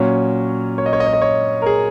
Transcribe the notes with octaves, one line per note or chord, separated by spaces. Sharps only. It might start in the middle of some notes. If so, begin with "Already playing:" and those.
Already playing: A#2 F#3 C#4
C#5
D#5
C#5
D#5
C#5
D#5
C#5
A#4
G#4